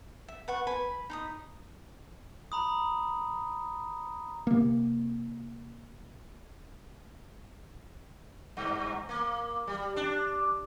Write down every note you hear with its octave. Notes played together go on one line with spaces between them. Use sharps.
E5
B4 F#5 C#6
B4 G#5 B5
D#4 B5 D#6
A#5 B5 D#6
C3 A#3
G2
A#3
G3
D4